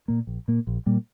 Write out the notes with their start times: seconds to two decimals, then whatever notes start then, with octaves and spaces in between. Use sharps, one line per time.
0.08 A#2 A#3
0.27 A#1
0.48 A#2 A#3
0.67 A#1
0.86 A#2 G3 A#3